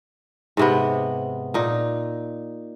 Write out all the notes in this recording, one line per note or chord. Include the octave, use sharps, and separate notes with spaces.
G#2 C3 B3
A#2 D#4